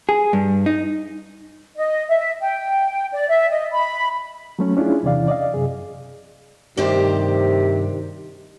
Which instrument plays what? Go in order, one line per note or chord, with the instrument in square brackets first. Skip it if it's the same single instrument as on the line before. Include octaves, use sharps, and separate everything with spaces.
[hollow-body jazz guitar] G#4
G2
D#4
[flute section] D#5
E5
G5
D5
E5
D#5
B5
[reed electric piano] F#3 A3 C#4
C#4 D4 E4 F4 G#4
E2 C3 E3 D5 F5
D5 D#5 F5
F#2 C3 G#4
[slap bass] G2 A3 [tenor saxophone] C3 [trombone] D#3 [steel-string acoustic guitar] D4 G4 C5